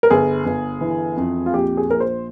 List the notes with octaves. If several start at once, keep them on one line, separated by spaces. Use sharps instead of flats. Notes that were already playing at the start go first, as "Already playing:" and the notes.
A#4
G1 G#4
G1
E3
F2
F4
A#1 G4
G#4
A#1 A#4
C5